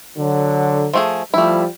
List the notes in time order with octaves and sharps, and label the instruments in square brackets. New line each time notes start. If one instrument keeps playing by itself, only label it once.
[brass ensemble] D3 F#3
[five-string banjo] F3 A3 G#4
[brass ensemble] F3 G3 [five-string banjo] A3 E4